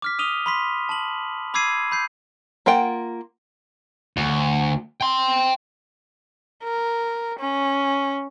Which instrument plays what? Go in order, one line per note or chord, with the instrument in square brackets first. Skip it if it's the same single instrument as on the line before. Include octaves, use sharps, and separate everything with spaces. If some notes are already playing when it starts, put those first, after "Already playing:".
[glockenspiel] D6 F6 B6
D#6 D#7 F7 G7
B5 C6 B6
A5 F#7
B5 D6 E6 G#6 C7 D#7
B5 G6 C7
[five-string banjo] A#3 F4 F#5 G5
[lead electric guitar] D2
G5 C6
[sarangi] A#4
C#4